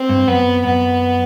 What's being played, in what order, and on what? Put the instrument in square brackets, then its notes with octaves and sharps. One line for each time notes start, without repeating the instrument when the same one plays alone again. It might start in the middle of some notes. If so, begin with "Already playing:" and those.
Already playing: [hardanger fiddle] C4
[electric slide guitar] G2
[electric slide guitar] F#2 [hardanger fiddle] B3
[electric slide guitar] F#2 [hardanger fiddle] B3